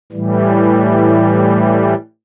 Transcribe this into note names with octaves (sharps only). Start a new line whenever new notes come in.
A2 E3 G3